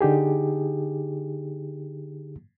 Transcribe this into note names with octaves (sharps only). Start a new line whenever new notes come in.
D3 D#4 G4 G#4